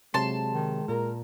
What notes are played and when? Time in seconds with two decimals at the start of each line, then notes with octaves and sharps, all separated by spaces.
0.14 C3 F#3 G#3 A5 C6
0.52 D#3
0.88 A#2 A#4 A#5